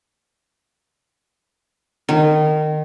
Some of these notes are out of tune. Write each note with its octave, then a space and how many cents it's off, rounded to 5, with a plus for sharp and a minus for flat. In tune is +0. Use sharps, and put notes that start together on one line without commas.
D#3 -25